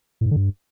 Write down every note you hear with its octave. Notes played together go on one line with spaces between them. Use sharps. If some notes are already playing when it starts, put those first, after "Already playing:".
A2
G#2
D3
G2